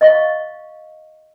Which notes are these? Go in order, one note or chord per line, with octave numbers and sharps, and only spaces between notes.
D#5 F5 C#6